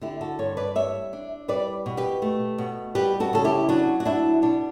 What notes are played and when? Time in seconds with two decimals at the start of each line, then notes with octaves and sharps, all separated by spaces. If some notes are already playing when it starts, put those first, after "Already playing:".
0.01 D3 E4 G4
0.21 F#4 A4
0.39 G2 A4 C#5
0.57 B4 D5
0.75 G3 C#5 E5
1.13 D4
1.48 G3 B4 D5
1.86 B2
1.97 G4 B4
2.22 A3
2.58 B2
2.95 G3 G4 B4
3.20 F#4 A4
3.33 C#3 A4
3.44 E4 G4
3.69 F#3 D4 F#4
4.00 F#4
4.05 D4 E4
4.42 B2 D4